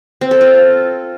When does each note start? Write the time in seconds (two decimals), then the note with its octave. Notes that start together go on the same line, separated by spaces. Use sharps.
0.21 C4
0.31 A4
0.41 F4